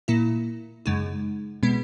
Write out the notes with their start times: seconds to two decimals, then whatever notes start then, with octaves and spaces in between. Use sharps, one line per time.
0.08 A#2 A#3 E4
0.86 F#2 C#3 G#3 D#4
1.63 B2 G#3 B3